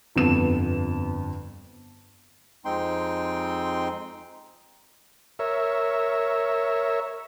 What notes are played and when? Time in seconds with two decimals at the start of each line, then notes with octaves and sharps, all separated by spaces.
0.16 G1 F2 B3 E7
2.65 F2 G#3 C4 D#4 G5 C6
5.39 A#4 C#5 E5